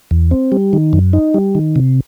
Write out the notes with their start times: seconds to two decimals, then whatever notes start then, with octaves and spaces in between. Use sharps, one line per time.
0.11 E2
0.31 C4
0.52 G3
0.73 D#3
0.93 F#2
1.13 D#4
1.34 G3
1.55 D#3
1.76 C3